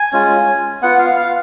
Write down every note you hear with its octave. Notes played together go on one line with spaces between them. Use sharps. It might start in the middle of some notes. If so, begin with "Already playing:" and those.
Already playing: G#5
G#3 C#4 F4
B3 F4 F#5
F5
F5